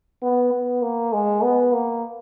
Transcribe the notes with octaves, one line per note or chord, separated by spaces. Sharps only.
B3
B3
A#3
G#3
B3
A#3